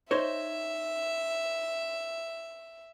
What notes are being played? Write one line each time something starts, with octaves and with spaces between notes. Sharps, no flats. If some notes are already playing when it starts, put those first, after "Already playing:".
D#4 C5 C#5 E5